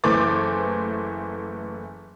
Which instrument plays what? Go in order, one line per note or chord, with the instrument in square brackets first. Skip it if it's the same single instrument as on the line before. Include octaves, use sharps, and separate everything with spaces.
[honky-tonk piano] F#1 E3 A3 C5 D6 A6